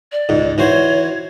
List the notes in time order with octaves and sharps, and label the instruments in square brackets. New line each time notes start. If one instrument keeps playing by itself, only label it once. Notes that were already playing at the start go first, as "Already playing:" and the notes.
[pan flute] D5
[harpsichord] C#2 G#2
[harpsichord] E3 F#4 C5 [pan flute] C#5